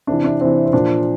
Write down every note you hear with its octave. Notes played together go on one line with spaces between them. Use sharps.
C3 E3 D4
D4
C3 E3 C4
C4
A#2 F3 D4